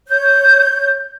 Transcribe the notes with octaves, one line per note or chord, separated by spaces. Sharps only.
C#5 G6